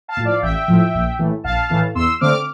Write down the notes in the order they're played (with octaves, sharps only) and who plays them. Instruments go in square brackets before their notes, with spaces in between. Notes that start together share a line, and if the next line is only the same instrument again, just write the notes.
[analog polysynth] F5 A5
A2 F3
D5 F5
A1 E5 G5
A2 F3
A#1
A2 E3 A3
A#1 F5 A5
A2 E3 A3
E2 C6 E6
D3 A3 C4 D6 F6